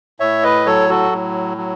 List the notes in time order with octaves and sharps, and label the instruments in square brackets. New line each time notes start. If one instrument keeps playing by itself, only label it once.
[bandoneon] A2 C#5 E5
B4 D#5
F#3 A4 C#5
F#4 A4
A2
F#3